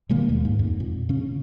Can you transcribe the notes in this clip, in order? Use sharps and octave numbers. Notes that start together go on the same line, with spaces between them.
B2 D#3 G#3 A#3
D#2
G#2
F2
A#2
C#3 C#4